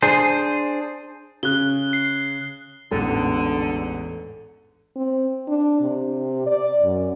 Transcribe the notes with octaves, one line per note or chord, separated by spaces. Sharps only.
D4 G#4 C5
C#3 F#6 G7
C7
A1 E2 G#2 D3 A4
C4
D4
C3
D5
F#2